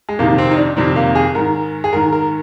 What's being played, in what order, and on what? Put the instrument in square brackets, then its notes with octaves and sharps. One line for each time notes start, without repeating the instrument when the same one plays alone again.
[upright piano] G#3
F2 C3 D#3 A#3
C4
D#4
D4
F2 C3 D#3 C4
A#3
G#4
G#2 D#3 A#4
G#4
G#2 D#3 A#4
A#4